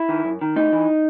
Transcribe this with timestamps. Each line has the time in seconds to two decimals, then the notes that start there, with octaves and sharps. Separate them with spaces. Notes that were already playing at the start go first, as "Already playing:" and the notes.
Already playing: E4
0.09 D#3
0.25 F#2
0.41 D#3
0.56 A2 D#4
0.72 E3